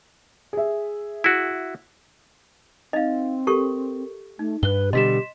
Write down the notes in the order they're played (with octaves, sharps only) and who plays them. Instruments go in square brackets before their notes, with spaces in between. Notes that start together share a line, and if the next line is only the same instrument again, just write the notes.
[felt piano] G#4 E5
[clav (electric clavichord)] E4 F#4
[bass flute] C4 [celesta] D#4 F5 [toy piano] D#5
[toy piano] G4 A4 C#6 [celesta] A#4
[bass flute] A3 [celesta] D#4
[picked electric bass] G2 [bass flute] B4 [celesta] F#6 G7
[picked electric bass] B2 D3 G3 [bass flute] G4 [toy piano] D#5 [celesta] C6 B6 E7